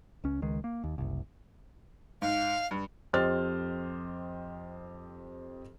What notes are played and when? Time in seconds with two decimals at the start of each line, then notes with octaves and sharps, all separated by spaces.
0.24 C#2 C#4
0.42 C#2 D#3 G#3
0.64 A#3
0.84 D#2
0.98 F#1 C2
2.22 G#2 F5
2.71 G2
3.13 F2 G4 C5 D#5 F6 A6